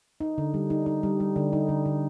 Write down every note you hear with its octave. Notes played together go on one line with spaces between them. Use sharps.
D#4
D3
G3
D#4
D#4
G3
G3
D3
D#4
D3
D3